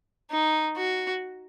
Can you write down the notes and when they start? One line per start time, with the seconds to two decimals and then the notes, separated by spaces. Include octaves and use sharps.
0.31 D#4
0.77 F#4